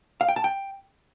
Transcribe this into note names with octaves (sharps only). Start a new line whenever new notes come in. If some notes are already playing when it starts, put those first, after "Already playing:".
F5
G5
A5
G5